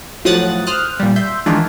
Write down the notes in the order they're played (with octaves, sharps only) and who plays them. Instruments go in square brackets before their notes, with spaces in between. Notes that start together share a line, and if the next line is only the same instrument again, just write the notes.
[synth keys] A2 F3 F#3 D#6 F#6 A6
C5 D#6 F6 F#6
A#2 G3
E5 C6 G6
D#3 E3 G#3 D4 E4 F4